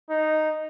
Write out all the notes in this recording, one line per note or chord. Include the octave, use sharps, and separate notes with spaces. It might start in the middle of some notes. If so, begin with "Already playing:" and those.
D#4